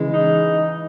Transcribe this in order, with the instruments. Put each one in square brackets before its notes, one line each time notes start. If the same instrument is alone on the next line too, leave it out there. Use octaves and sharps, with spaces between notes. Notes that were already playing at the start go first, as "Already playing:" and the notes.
Already playing: [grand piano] C#3 E3 [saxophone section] G#3
[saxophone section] D#4